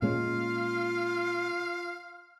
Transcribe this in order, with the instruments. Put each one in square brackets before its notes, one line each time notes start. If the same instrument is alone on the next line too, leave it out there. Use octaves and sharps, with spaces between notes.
[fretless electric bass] A#2 G#3 C#4 [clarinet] F4 [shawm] F5